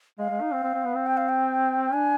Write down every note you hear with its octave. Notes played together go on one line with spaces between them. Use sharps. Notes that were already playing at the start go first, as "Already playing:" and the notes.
G#3 F5
G#3
D#4
C4
C4
C4
B3
C4
G5
F5
G5
D4 G#5